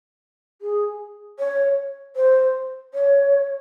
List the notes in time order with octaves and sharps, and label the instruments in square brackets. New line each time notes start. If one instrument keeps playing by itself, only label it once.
[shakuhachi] G#4
C#5
C5
C#5